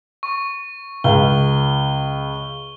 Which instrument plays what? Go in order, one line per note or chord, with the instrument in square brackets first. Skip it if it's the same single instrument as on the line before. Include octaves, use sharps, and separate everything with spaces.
[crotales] C#6
[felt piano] C#2 [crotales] G7